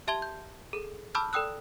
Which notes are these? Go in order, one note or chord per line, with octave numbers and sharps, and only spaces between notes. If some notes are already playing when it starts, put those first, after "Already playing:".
G4 E5 A5 C6 G#6 G7
G6
G#4 A4
A5 B5 D6 E6 F6 G6
A4 D5 G5 D#6 E6 F#6